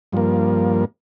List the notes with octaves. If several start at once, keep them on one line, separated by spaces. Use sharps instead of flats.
G2 F3 A#3